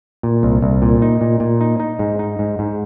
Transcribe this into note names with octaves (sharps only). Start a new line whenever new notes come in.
A#2
C2
C2
A#2
D#4
A#2
A#2
D#4
D#4
G#2
D#4
G#2
G#2